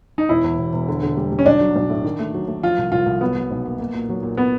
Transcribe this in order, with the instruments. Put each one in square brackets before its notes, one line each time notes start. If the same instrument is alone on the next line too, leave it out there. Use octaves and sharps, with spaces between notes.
[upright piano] D#4
[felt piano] E1 [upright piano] E4
[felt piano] E2
E1
E1
D3
D3
G3
G3
[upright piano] C#4
[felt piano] B1 [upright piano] D4
[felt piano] F#3
B1
A2
D#3
A3
F#3
A3
[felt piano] F3 [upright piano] F4
[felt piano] C2
[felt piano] C2 [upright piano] F4
[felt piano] C2
[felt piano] F#3 [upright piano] B3
[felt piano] F#3
B1
A#3
A#3
A#2
F#3
A#2
[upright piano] B3